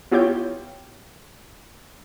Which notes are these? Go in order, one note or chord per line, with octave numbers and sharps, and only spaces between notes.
B3 E4 F4 G4 C#5 G6